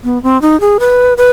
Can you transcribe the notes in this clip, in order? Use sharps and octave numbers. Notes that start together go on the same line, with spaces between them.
B3
C4
D#4
G#4
B4
B4